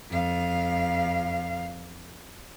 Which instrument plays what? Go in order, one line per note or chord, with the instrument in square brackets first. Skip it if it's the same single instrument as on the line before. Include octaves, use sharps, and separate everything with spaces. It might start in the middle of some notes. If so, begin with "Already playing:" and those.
[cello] F2 F5